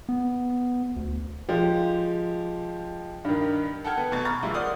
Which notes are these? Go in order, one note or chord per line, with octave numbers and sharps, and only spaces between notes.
B3
D2
F3 G#3 G4
G2 D#3
A4 F#5 G5 A5 F6 G#6
B3 A4 B4
D#1 B2 A6
A#5 B5 C#6 F6 A6
D#3 E3 G3 G#3 E4 F4
A#4 C5 D5 F#5 D#6 F6